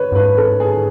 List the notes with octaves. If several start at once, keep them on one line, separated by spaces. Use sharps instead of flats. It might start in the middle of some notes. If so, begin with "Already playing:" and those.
Already playing: B4 C#5
F#2
G#2 B4
A4
G#4